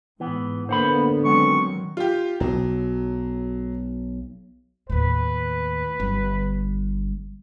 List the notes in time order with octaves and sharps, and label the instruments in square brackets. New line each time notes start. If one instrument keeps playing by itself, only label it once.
[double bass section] G#2 [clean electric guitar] E3 B3
[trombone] D3 [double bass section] A#3 B3 [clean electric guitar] C5 F#5 B5
[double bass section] D#3 F#3 [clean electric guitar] G#3 B3 C4 [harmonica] C#6
[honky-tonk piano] F4 G4
[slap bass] B1 [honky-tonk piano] F#3
[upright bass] D#2 A2 [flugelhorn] B4
[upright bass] G1 G3